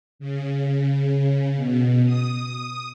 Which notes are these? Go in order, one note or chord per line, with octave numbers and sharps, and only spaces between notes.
C#3
B2
D#6